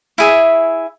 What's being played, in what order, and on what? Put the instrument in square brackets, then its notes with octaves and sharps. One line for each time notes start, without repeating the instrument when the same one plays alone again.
[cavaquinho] E4 G#4 E5